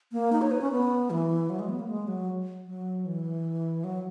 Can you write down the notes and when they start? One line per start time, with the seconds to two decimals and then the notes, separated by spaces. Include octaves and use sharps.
0.12 A#3
0.32 D#4
0.42 C#5
0.51 B4
0.61 C#4
0.72 B3
1.10 E3
1.49 F#3
1.59 G#3
1.69 B3
1.79 A#3
1.89 G#3
2.07 F#3
2.66 F#3
3.06 E3
3.84 F#3